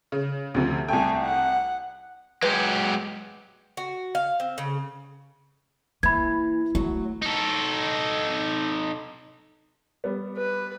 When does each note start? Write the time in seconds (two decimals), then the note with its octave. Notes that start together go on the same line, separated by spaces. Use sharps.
0.12 C#3
0.54 D2 C3 F3
0.88 C2 A3 G5 G#5
1.22 F#5
2.43 F#3 G#3 G4 B4
3.77 F#4
4.15 F5
4.40 C4
4.58 C#3
6.03 E3 A#3 B5 G#6
6.75 F#3 A3
7.22 D#4 A4
10.04 G3 B3
10.37 B4